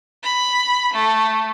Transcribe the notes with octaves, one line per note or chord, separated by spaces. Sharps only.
B5
A3